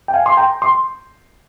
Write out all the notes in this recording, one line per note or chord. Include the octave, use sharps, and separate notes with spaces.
G5
F5 G#5
C6
G5 A#5
C6